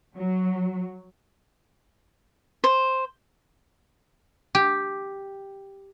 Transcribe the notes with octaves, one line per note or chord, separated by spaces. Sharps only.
F#3
C5
G4